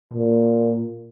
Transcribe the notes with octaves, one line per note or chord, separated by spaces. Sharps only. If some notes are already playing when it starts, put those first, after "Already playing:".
A#2